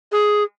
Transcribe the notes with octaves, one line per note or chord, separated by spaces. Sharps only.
G#4